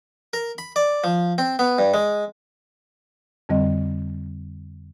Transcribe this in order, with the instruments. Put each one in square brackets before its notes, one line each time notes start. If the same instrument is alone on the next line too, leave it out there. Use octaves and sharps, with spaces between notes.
[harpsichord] A#4
B5
D5
F3
C4
B3
G2
G#3
[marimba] F2 D3 G3 C4 D#5